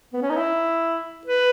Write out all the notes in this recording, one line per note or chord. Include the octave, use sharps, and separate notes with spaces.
B3
C#4
D#4
E4
B4